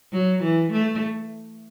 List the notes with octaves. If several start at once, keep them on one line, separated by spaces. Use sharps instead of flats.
F#3
E3
A3